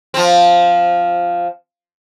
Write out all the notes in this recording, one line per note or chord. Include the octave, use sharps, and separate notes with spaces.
F3 C4